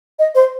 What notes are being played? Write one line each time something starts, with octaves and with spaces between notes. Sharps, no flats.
D#5
C5